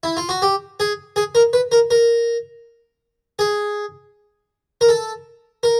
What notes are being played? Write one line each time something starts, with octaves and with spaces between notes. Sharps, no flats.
E4
F4
F#4
G4
G#4
G#4
A#4
B4
A#4
A#4
G#4
A#4
A4
A#4